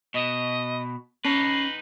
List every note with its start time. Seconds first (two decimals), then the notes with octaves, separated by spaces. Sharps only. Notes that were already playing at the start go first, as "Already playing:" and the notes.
0.14 B2 D#5
1.24 C#4 D#4 B4 A5 C7